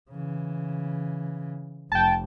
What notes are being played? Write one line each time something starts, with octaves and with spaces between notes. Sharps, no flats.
C#3 E3
F1 G5 A5